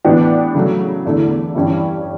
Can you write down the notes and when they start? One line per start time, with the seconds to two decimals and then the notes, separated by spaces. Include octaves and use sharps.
0.05 A2 E3 B3 D4 G4
0.54 C#3 F#3 A3
1.05 E2 D3 A3 E4
1.55 G2 E3 G3 C#4